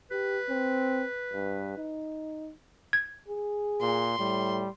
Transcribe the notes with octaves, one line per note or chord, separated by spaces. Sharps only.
G4 B4
C4
G2
D#4
G#6
G#4
A#2 C6
A2 G3